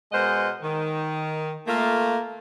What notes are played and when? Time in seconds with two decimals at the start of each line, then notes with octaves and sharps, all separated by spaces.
0.12 B2 G#3 A#4 C5 D#5 F#5
0.62 D#3
1.67 A3 A#3 F4